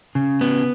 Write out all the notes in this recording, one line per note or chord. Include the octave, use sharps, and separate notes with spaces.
C#3
B3